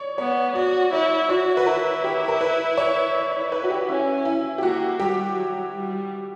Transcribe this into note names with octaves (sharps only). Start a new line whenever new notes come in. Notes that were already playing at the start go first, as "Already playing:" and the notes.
Already playing: C#5 D5
B3 C#5
F#4 D5
E4 C#5
F#4 C#5
B4
E4 A#4
G4
A#4
B4
C#5
D5
B4
F#4
G4
C#4 E4
E4
G4
A#3 F#4
G3 G4
F#3
G3